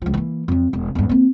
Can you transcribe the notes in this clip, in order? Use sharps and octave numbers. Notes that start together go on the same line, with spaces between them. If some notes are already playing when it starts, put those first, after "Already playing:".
C#2 F3
E3 A#3
F2 F#3
E1
E2 G2
A#3 C4